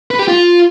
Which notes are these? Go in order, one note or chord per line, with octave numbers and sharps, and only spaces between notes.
B4
G4
F4